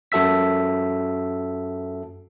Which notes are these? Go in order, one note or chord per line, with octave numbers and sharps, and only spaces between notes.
F#2 F#4 A4 E5 E6 B6